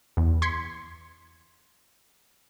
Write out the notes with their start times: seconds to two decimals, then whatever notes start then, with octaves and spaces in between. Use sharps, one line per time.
0.17 E2
0.42 C6 G#6 B6 C#7